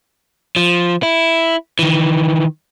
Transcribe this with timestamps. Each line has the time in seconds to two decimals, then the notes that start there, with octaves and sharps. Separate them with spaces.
0.56 F3
1.03 E4
1.79 D#3 E3